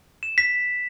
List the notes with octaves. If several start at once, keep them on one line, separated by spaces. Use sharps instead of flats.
E7
B6